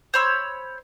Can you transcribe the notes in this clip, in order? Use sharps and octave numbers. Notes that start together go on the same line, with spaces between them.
C5 C#5 B5 E6